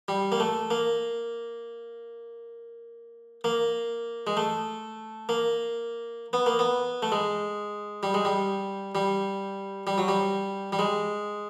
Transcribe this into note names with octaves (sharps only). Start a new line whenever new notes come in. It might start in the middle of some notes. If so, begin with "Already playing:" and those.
G3
A#3
A3
A#3
A#3
G#3
A3
A#3
B3
A#3
B3
A3
G#3
G3
G#3
G3
G3
G3
F#3
G3
G3
G#3